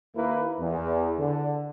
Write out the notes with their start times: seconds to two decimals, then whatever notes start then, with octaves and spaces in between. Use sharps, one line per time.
0.16 D#2 A#3 E4 B4
0.60 E2
1.19 D3